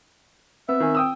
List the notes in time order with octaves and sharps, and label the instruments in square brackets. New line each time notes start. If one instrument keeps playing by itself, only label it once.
[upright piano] B3 [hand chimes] C4 [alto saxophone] E5
[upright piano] D#3 G#5
G5 D#6 E6